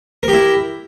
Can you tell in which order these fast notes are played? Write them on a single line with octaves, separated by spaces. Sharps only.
A#4 G4 E4